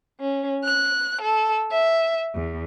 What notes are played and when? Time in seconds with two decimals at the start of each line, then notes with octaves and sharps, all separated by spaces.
0.20 C#4
0.64 F#6
1.21 A4
1.72 E5
2.34 E2